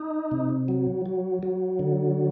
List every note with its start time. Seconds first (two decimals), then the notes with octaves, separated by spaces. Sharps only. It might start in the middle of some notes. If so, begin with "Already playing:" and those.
Already playing: D#4
0.31 C3
0.68 F#3
1.06 F#3
1.43 F#3
1.79 D3